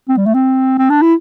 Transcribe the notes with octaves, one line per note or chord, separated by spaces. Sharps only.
C4
G3
A3
C4
C4
D4
E4